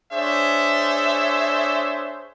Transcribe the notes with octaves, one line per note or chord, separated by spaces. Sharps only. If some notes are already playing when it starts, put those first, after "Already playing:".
D4 G#4 C5 C#5 E5